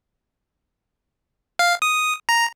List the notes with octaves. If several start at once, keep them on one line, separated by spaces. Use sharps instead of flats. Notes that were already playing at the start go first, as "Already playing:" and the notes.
F5
D#6
A#5